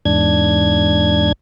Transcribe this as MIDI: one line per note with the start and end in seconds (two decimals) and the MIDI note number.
0.05 1.32 40
0.05 1.32 44
0.05 1.32 62
0.05 1.32 92